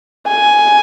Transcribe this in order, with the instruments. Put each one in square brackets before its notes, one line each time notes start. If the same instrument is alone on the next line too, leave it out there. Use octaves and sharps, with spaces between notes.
[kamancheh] G#5